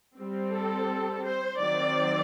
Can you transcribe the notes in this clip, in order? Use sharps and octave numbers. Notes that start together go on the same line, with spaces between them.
G3 C4
A4
C5
D#3 F#3 C4 D5